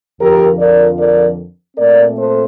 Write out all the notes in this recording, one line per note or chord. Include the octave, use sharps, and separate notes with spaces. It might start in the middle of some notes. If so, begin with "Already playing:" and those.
F2 D3 F3 G4 A#4
A#4 D5
A#4 D5
A#2 A3 C4 A#4 D5
A4 C5